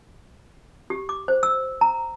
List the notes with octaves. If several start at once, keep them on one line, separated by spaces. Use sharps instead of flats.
G4
D6
C5
E6
A#5